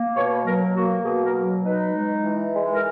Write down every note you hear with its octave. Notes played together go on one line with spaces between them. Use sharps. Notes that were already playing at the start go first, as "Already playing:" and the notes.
Already playing: A#3
B2 C#5
B4
F#3 A#4
A#3 F#4
B2 G#4
A#4
F#3
D#4 B4
G#3
E3
G#3
A#4